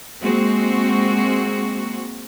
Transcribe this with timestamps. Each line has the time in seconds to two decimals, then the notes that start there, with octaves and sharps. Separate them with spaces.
0.22 G#3 A#3 C4 F#4